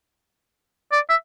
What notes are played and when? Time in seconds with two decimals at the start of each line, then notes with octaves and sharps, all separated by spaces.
0.92 D5
1.09 E5